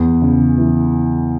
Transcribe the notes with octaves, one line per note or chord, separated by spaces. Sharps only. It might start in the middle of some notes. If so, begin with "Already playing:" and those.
Already playing: E2
C#3
E3